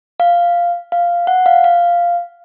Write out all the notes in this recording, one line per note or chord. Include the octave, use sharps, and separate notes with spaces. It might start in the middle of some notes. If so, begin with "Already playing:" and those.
F5
F5
F#5
F5
F5